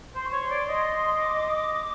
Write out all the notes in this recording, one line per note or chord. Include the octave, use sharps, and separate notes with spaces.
C5 C6
C#6
C#5 C6
D5
D#5
D6